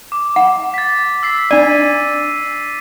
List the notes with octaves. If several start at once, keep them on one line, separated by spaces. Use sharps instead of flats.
D6
F#5
A6 B6
E6 B6 C7
D4 D5 B6 D#7